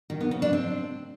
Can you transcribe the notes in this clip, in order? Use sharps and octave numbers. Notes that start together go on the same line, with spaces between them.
D#3
B3
C#3
D4
C4